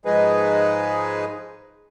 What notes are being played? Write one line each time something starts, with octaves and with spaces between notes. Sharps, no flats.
G#2 F3 G#3 D#4 G#4 B4